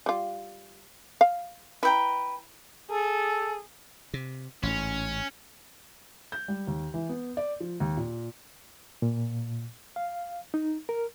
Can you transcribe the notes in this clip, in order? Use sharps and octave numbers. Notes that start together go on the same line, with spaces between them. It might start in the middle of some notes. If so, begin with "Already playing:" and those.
G3 F4
F5
E4 B4 G5 A#5
G#4 A4
C3
A1 G#2 C#4
G6
G3
D#2
E3
B3
D5
F3
D#2
A#2
A#2
F5
D#4
A#4